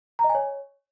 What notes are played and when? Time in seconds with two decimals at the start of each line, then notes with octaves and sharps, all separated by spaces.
0.19 A#5
0.24 D#5
0.29 G#5
0.35 C#5